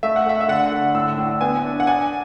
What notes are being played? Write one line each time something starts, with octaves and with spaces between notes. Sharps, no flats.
A3 E5
F#5
A3 E5
E5
D3 F#5
D3
A2 E6
A2
B3 G#5
D4
F#5
D4 G#5